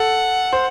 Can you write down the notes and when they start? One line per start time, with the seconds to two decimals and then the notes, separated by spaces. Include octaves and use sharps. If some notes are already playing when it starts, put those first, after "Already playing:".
Already playing: A4 F#5
0.53 C5